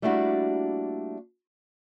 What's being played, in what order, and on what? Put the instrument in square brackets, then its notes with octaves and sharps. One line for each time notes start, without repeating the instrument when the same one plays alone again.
[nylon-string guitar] G3 A3 A#3 D4 E4 F#4